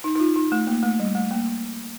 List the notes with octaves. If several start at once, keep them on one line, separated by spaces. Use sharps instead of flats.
D#4
D#4
F4
D#4
A3
A#3
A3
G3
A3
A#3